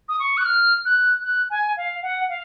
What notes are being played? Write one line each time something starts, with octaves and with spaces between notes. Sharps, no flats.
D#6
C#6
F#6
F6
F#6
F#6
G#5
F5
F#5
F5